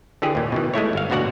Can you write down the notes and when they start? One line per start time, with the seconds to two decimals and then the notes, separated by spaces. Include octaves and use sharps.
0.22 D3 E3 G4 G#4
0.35 D#2 A#2
0.52 B2 D#3 E3
0.74 G#3 A3 E4 C#5
0.93 G1 F5
1.10 A1 D2 B2 F#4 D5 F#5